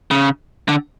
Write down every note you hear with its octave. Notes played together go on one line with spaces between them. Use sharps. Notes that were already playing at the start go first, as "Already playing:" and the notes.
C#3
D3